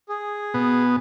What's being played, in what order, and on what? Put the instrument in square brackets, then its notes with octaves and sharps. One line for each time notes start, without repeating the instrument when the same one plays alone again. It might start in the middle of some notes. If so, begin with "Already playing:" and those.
[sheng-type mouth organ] G#4
[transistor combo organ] B2 B3